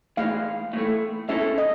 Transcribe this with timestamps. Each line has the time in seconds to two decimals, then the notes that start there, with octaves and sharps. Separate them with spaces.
0.17 A2 E3 G#3 F5
0.73 A2 E3 A3
1.29 G#3 C#4 E4 A4 E5
1.58 D#5